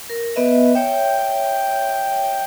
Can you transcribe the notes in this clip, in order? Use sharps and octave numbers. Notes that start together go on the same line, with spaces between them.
A#4
B3 B4 D#5 E5
C#5 E5 G5